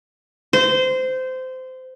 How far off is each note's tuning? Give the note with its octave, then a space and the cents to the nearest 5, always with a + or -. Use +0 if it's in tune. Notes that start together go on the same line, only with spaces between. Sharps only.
C5 -20